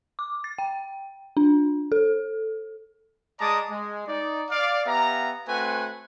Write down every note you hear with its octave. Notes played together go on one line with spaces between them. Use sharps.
D6
A6
G5
D4
A4
G#3 D5 A5 A#5 D6 D#6
G#3
D#4 D5
D5 F5
B3 G4 E5 F5 A#5
A3 C4 F#4 B4 F#5 G#5